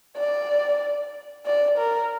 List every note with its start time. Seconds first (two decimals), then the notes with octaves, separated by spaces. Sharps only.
0.17 D5
1.46 D5
1.78 A#4